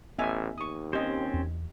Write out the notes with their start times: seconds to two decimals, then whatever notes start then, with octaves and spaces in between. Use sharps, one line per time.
0.19 A1 B3 D#5 E5 G#5
0.58 D#2 C#6 D#6
0.93 C4 C#4 G4 C5 D#5
1.34 E2